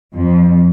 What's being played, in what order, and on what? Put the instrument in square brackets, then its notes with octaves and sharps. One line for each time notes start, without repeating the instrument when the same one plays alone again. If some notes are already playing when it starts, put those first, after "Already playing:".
[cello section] F2